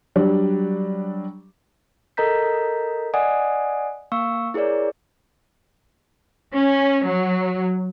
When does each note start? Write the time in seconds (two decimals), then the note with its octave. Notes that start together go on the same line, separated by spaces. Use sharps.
0.16 F#3 G3 D4
2.17 A4 A#4 D#5 A#5 G6 B6
3.14 D5 D#5 F#5 G#5 D#6
4.12 A#3 F5 C#6 E6
4.54 E4 G#4 A#4 C#5 D5
6.53 C#4
7.05 F#3